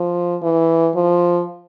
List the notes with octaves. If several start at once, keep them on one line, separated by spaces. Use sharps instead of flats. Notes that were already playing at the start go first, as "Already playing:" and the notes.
Already playing: F3
E3
F3